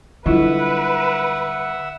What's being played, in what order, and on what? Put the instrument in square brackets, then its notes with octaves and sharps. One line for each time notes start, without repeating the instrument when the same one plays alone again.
[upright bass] D3 G3 [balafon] F#3 E4 F4 [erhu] B4 [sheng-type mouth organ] E5 F#5